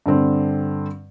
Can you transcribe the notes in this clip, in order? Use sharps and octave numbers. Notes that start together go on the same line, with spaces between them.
G2 D3 C4